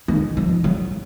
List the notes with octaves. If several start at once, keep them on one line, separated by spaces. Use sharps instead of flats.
D#3
F3
F#3